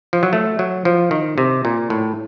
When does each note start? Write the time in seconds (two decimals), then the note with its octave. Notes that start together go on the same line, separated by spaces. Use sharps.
0.13 F3
0.23 F#3
0.33 A3
0.59 F#3
0.85 F3
1.11 D#3
1.38 C3
1.65 A#2
1.90 A2